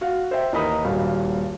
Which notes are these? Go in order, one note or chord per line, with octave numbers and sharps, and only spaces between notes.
F#4 F5 F#5
C5 E5 G5
D#2 E3 D#4 A#4 B5 D#6
D#1 G2 A#2 F#4 F5